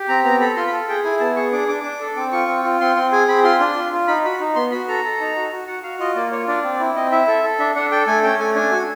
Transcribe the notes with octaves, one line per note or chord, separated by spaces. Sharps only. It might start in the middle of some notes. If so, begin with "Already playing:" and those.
Already playing: G4
C4 A#5
B3 A#5
A4 B5
F4 C6
B5
A4
G#4 G5
E4 G#5
B3 A5
G#4 C#6
D4 D6
D4 D6
D4
A4
C4 D6
F4 C#6
C4
F4
C4 C6
C4 C6
G#4 G#5
C4 B5
F4 C6
D4
F4
F4
D#4 B5
F#4 B5
D#4
B3 C6
F#4 B5
A4 A#5
A4
D#4
F#4
F#4
F#4 F#5
F#4 F5
F4 D#5
A#3 D5
F4 C#5
D4 D5
C4
E4
C4 D#5
E4 E5
A4
A4
D4 E5
D4 F#5
A4 G5
A3 G#5
C#4 G5
A3 G#5
D4 G#5
F#4